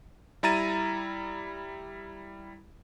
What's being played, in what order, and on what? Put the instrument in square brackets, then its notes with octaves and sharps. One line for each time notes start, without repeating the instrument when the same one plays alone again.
[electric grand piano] G3 E4 A#5 A6 D#7